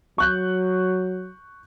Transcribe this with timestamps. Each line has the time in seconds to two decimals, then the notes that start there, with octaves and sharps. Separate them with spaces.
0.18 F#3 C#6 F#6 G6